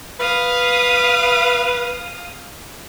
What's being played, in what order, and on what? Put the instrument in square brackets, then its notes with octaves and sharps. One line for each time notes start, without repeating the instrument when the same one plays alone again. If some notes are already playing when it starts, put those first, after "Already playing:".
[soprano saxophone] B4 [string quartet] F5 D#6 F6